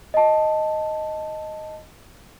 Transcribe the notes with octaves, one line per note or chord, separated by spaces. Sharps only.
D#5 A5